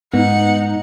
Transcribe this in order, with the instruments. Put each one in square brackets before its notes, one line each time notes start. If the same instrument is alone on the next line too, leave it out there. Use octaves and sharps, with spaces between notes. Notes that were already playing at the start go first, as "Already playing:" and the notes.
[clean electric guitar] G#2 [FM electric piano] B3 [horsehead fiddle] D#4 [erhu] F#5